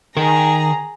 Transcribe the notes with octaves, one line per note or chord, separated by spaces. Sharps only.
D#3 G#4 A#4 A#5